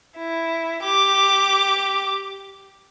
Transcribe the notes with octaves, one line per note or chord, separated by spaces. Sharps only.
E4
G4 D6